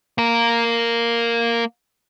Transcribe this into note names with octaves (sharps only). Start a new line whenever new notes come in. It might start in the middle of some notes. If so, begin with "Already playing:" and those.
A#3 A#4